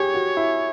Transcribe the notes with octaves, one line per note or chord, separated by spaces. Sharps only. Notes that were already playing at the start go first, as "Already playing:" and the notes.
Already playing: G4 G#4 C#5
F#4
E4